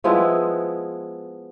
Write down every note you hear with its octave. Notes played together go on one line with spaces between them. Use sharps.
F3 G#3 B3 E4